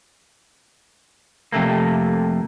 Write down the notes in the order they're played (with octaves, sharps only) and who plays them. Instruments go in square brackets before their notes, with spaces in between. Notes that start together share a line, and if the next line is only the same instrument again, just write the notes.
[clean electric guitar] F2 C3 A3 A#3